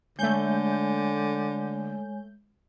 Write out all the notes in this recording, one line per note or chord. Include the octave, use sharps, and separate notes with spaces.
D3 G#3 A3 C#5 G#5 G6